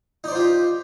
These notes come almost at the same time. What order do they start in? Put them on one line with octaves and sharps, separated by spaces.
D#4 D5 C5 F4 G4